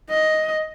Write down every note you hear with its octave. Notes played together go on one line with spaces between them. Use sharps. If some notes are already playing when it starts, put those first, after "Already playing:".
D#5